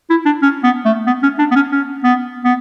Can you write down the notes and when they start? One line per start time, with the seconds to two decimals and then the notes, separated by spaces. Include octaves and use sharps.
0.10 E4
0.25 D4
0.42 C#4
0.63 B3
0.85 A3
1.07 B3
1.23 C#4
1.39 D4
1.51 B3
1.55 C#4
1.72 C#4
2.04 B3
2.45 B3